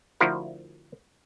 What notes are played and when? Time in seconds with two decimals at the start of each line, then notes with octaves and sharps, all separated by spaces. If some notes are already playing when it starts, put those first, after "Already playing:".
0.20 D2 F3 E4 F#4 A#4